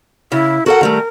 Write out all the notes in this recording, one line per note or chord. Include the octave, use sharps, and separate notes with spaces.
C#3 E4
F#4 A4 A#4 F#5
D#3 G3 A3